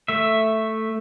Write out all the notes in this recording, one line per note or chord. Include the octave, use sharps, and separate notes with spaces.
A3 E5